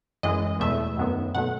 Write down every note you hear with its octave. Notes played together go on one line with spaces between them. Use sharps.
F#2 E3 G#3 D#5
E2 B2 A3 E5
F#2 D#3 F#3 B3
B2 F#3 A3 F#5